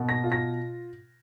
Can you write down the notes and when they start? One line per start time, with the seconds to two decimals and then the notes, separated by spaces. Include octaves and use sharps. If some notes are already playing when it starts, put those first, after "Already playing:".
Already playing: B2 A#3
0.09 A#6
0.24 F4
0.32 A#6